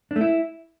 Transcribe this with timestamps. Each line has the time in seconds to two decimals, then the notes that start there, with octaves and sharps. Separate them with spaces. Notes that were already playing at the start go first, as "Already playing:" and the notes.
0.11 D4
0.16 A3
0.21 E4